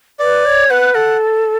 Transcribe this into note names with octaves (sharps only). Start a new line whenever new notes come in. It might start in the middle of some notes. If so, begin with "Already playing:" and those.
B4 D5
C#5
B4 F#5
A4 F#5